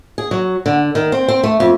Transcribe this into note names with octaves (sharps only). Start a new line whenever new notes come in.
G#4
F#3
D3
D#3
C4
C4
A3
F2